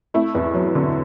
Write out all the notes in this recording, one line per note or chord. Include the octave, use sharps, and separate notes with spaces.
A3 E4
E2
F#3
D3